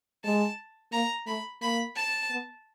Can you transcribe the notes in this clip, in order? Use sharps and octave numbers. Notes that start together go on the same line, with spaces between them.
G#3 A5
A#3 A#5
A3 B5
A#3 B5
A5
B3